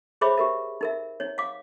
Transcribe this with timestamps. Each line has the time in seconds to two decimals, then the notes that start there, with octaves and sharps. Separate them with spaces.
0.21 G#4 C5 C#5 E5 B5 D6
0.37 G4 A#4 E5
0.81 D#4 A#4 E5
1.20 D#4 C#5
1.38 F5 D6